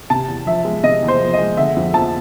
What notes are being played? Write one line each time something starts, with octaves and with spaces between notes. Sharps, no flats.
C3 A5
E2
F3 E5
G#3
C3 D#5
E2
C5
F3
D#5
G#3
D3 E5
F2
F3 A5